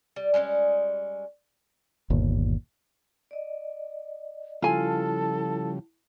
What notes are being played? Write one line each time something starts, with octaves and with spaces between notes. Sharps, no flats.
G3
G3 G#3 B3 C#4
G1 D#2 A#2
D5 D#5
C#3 F3 G3 E4 F4 A4 G#5 A5